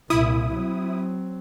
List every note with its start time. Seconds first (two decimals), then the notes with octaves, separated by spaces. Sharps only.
0.10 C2 A#2 E4 D#6
0.56 F#3 C4